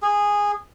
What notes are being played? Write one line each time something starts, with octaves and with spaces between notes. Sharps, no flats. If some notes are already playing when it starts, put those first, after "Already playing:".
G#4